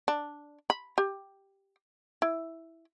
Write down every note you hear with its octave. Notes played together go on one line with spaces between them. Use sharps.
D4
B5
G4
E4